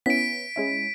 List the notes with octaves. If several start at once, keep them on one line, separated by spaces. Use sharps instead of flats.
B3 C#4 E4 B6 D7
G#3 C#4 E4